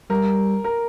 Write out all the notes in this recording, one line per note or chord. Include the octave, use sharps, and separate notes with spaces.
G3 A#4
A#4